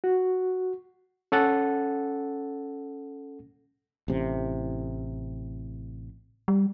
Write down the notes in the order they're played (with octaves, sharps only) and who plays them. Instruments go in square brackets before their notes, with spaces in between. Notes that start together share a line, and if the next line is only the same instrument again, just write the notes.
[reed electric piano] F#4
C#4 A4 F#5 A6
[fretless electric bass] A1 C3
[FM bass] G3